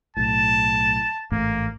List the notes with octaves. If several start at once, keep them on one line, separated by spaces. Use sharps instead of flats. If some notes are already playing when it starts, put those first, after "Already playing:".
B1 A2 A5
A1 G#2 A3 A#3